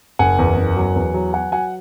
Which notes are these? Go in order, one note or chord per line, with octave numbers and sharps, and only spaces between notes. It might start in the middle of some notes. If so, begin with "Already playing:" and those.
F#1 F#5 G#5
E2
F#1
F#3
E2
F#3
F#3 F#5 G#5
F#3 F#5 G#5